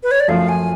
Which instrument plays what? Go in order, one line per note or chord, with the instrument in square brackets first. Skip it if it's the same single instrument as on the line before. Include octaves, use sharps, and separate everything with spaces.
[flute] B4
C#5
D5
[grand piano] F#2 F3 A3 F4 [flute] F5
[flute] G#5